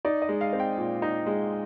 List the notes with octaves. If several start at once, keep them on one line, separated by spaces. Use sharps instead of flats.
D#4 D5
D#5
G#3
F5
C4
G5
A#2
D#4
G#3